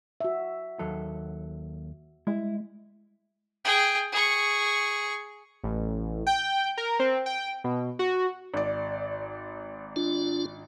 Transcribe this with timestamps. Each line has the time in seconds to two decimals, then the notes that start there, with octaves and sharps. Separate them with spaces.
0.21 F#4 E5
0.79 D#2 F#3 A4
2.27 G3 G#3 E4
3.65 G#4 G5
4.13 G#4 C#6
5.64 A1
6.27 G5
6.77 A#4
6.99 C4
7.26 G5
7.64 B2
7.99 F#4
8.54 G#1 D5
9.96 D4 F4